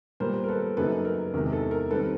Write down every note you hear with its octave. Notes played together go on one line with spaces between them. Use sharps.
A#2 G3 B3 A#4 C5
A#4
A4 B4
F#2 C#3 F#3 A#3 D#4 A4 B4
A#4
E2 C3 D#3 G#3 A#4
A4
A#4
D#3 G3 C4 A4 B4